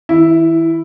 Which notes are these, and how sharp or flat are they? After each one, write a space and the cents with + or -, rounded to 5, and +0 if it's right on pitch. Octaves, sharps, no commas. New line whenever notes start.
E3 -45 E4 +0